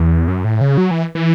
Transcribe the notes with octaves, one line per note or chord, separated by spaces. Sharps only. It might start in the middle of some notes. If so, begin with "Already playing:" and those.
Already playing: E2
F#2
A2
C#3
F#3
E3
E3